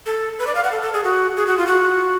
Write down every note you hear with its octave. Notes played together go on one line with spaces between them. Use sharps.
A4
B4
D5
F5
F#5
A4
A4
G#4
F#4
G#4
F#4
F4
F#4